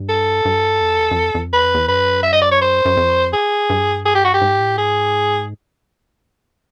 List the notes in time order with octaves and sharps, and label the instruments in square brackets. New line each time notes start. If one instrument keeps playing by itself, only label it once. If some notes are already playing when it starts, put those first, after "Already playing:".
Already playing: [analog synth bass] G2
[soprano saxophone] A4
[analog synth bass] G2
F2
E2
F#2
F2
F2
[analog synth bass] E2 [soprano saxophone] B4
[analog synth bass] F2
E2
[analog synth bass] F#2 [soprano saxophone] B4
[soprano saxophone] E5
D#5
D5
C#5
C5
[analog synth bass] F#2
F2
[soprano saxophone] G#4
[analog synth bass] G2
[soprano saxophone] G#4
G4
F#4
G4
[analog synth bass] G#2
A2
[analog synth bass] G#2 [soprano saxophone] G#4